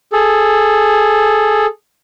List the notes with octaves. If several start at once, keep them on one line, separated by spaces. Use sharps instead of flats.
G#4 A4